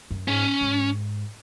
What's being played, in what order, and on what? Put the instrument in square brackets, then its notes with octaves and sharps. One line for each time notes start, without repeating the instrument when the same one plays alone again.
[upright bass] F#2
[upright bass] G#2 [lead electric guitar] C#4
[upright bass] G#2